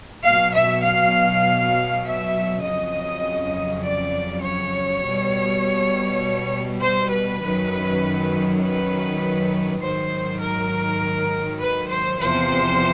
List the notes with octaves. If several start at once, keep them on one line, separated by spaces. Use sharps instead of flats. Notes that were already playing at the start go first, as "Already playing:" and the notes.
B2 F#3 F5
E5
F5
E5
F2 C#3 F#3 D#5
D5
C#5
B2 G3
C5
B4
F#2 D#3 F#3
B4
G#2 D#3 F#3 C5
A#4
B4
C5
E2 C3 F3 C5